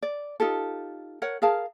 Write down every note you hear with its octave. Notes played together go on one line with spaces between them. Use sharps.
D5
D#4 F4 G4 A4
A#4 C#5 F#5
G#4 A#4 F5 A5